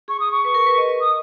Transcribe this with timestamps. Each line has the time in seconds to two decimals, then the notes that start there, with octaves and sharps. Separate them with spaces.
0.08 G#4 C#6
0.20 D#6
0.31 C#6
0.45 B4
0.54 A#4
0.67 B4
0.78 D#5
0.89 D#5
1.01 D#6